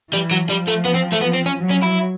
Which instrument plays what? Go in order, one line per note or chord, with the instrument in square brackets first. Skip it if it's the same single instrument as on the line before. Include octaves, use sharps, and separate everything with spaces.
[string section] E3 [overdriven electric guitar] G3
[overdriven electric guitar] F#3
[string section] F3 [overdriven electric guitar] G3
[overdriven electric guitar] A3
B3
C4
A3
B3
C4
C#4
[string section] F#3
[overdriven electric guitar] C#4
E4